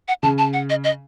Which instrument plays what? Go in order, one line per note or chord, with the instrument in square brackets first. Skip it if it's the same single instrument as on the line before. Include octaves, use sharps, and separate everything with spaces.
[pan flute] F#5
[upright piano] C#3 [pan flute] A5
[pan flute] A5
F#5
D#5
D#5